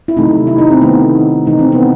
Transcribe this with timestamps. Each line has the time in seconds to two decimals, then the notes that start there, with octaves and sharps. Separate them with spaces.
0.08 E4
0.16 C3 D#3 F#3 A3 D#4
0.47 E4
0.58 D#4
0.71 C4
0.81 C3 D#3 A3 B3
1.46 C3 E3 A3 D#4
1.59 C4
1.72 B3